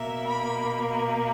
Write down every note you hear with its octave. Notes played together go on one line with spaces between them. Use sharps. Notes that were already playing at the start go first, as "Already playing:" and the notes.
Already playing: B2 A#3 E5
B5